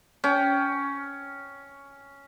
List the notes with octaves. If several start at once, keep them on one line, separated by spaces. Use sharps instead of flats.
C#4 G5